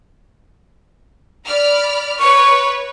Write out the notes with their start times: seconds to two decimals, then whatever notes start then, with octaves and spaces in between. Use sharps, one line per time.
1.46 D5 B5 F6
2.19 B4 C#5 C#6